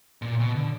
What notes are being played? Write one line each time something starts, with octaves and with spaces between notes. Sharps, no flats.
A#2
B2
D3